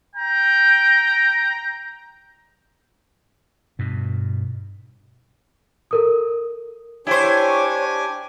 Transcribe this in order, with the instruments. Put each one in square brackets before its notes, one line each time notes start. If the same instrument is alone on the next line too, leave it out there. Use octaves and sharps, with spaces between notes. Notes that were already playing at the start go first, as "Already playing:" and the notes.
[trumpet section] G5 A#5
[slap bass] G2 B2
[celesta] A4 A#4 D#6
[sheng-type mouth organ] D4 G4 G#5 [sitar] E4 C5 [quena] C#5